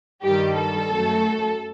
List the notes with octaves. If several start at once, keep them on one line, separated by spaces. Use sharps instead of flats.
G2 D#3 G3 G4
A4
F#2 F#3 A3